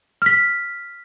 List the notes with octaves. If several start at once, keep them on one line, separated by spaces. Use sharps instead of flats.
F6 B6